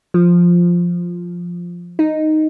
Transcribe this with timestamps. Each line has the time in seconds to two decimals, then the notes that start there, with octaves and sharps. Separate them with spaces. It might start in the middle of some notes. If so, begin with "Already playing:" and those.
0.14 F3
1.99 D#4